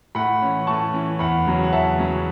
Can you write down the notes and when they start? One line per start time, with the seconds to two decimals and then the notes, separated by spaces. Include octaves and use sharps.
0.15 A2 F#5 B5
0.42 E3 C#4
0.67 A2 A5 C#6
0.93 E3 C#4
1.19 E2 F#5 B5
1.45 C#3 F#3 C#4
1.64 F#5
1.72 E2 E5 A5
1.98 C#3 F#3 C#4